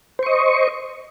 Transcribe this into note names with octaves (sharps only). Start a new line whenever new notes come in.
C5 D#5 C#6